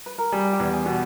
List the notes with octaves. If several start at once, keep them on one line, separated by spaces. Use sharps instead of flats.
B4
A#4
G3 G#4
G4
E2
G#4
B2